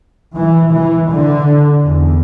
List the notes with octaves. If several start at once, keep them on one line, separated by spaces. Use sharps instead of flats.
E3
E3
D3
E2